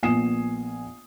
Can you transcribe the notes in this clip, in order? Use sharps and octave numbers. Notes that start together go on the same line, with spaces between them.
A#1 B3 G#5 D#6 C7 E7